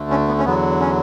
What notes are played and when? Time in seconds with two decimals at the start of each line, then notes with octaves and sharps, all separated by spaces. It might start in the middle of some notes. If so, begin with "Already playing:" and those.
Already playing: D2 D3 A3
0.10 C#4
0.28 B3
0.38 C#4
0.45 E2 D3 F#3 B3
0.80 C#4